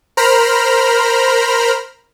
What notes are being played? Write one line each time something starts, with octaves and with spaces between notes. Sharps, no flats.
A#4 C5 A#5 B5 F6